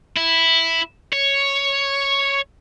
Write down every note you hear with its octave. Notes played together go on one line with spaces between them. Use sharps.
E4
C#5